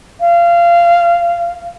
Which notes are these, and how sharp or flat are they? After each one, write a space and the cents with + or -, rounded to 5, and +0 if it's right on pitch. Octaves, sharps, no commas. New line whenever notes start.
F5 -20